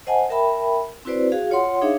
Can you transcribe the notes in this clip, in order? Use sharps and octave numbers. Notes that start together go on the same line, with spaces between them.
C5 D#5 F#5 G#5 A5
A#4 E5 G5 A5 B5
C4 E4 F#4 B4 C5 D5
F#4 G#4 F5
F4 C#5 F#5 C6
D4 D#4 G#4 C#5 E5 F5